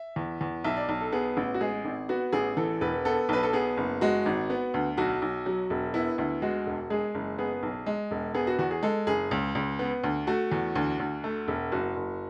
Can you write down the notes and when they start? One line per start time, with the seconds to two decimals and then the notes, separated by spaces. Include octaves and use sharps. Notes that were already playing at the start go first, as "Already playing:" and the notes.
Already playing: E5
0.16 E2
0.41 E2
0.64 B1 E5
0.77 D5
0.89 B1
1.01 A4
1.12 B3 G#4
1.37 A1
1.54 F#4
1.61 G#3 G#4
1.85 G#1
2.09 B3 F#4
2.33 A1 G#4
2.57 E3 A4
2.81 E1 B4
3.05 B3 A4
3.29 B1 B4
3.43 A4
3.53 B3 G#4
3.77 F#1
4.01 G#3 F#4
4.26 G#1
4.50 B3
4.74 D2
4.97 B1 F#4
5.22 B1
5.46 F#3
5.70 E1
5.94 B3 E4
6.18 D2 E4
6.42 G#3 F#4
6.66 E1
6.90 G#3 G#4
7.15 F#1
7.38 B3 G#4
7.63 B1
7.86 G#3
8.11 E1
8.35 B3 G#4
8.47 F#4
8.59 E2 F#4
8.71 G#4
8.83 G#3 A4
9.07 F#1 G#4
9.31 C#2
9.55 C#2
9.79 B3
10.04 D2
10.27 A3 F#4
10.52 E2
10.75 D2
11.00 D2
11.24 A3
11.48 E1
11.72 F#1 F#4
11.96 F#1